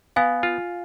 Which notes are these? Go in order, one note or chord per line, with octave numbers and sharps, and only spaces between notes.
B3 F5 G#5
F4